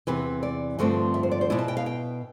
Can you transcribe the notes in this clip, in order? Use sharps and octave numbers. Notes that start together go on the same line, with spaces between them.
E2 C3 E3 B4
D5
G2 D3 F3 A3 C4
E5
C5
D5
C5
B2 B3 E4 D5
A5
G5
F5
G5